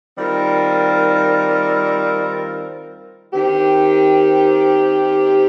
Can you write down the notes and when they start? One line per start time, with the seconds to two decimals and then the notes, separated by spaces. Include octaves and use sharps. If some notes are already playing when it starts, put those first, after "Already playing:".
0.17 D#3 G3 C4 F4 A#4
3.32 D#3 C4 G4